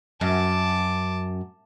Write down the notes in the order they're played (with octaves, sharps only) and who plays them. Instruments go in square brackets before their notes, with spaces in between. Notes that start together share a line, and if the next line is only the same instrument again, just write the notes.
[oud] F#2 [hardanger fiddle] A5 D6